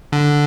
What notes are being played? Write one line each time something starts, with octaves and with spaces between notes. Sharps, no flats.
D3